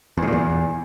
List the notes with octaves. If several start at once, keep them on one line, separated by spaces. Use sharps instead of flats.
E2
G#2
A#2
E2